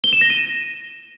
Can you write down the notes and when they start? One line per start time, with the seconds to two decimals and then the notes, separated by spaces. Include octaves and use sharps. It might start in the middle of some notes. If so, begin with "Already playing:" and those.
0.04 G7
0.13 E7
0.21 A#6
0.30 D#7